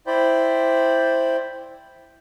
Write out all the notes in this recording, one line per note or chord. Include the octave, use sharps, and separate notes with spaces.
E4 C5 D5 G5 B5